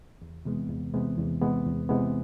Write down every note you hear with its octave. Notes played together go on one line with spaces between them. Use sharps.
E2
C3 E3 G#3 B3
E2
C3 E3 G#3 B3
E2
C3 E3 G#3 B3
E2
C3 E3 G#3 B3